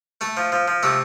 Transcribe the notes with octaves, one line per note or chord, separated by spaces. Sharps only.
A3 A4
F3
F3
F3
C3 A3 A4